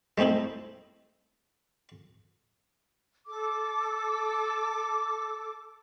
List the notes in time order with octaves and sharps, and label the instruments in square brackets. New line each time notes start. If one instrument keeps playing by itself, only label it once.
[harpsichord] G#3 A3 C4 D#4 E4
[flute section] A4 D6